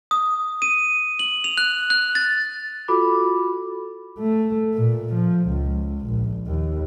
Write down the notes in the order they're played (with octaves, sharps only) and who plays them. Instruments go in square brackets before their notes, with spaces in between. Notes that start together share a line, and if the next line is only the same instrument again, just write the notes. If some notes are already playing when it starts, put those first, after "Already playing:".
[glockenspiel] D#6
D#7
F#7
F7
F#6
F#6
A6
[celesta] F4 F#4 A4 B5 D6
[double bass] A3
A#2
F3
C#2
A#1
D#2